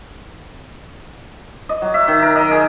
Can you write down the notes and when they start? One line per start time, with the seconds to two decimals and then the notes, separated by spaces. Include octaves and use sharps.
1.69 D#5
1.82 F#3
1.94 E5
2.08 D#3
2.22 A#4
2.35 D#5
2.51 G#4